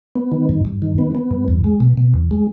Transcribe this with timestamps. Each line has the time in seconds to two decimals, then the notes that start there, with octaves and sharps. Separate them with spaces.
0.16 B3
0.32 D#3
0.49 G2
0.65 G2
0.82 D#3
0.98 B3
1.15 B3
1.31 G2
1.48 E2
1.64 G#3
1.80 B2
1.97 B2
2.14 E2
2.31 G#3